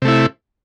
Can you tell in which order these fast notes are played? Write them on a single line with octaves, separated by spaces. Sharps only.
C3 A3 E4